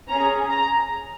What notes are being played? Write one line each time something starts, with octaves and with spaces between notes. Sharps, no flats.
C#4 G#4 A#5
A#5